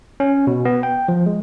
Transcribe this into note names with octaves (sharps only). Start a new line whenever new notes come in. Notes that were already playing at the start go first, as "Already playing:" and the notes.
C#4
B2
B3
G5
F3
G#3